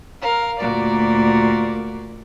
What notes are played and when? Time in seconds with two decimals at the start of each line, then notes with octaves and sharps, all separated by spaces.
0.22 A#4 F5
0.60 D2 A#2 A#3 F#4 A#4 D5